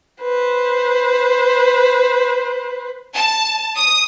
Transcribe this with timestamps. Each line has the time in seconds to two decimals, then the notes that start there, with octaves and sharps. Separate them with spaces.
0.22 B4 C5
3.14 A5
3.76 D#6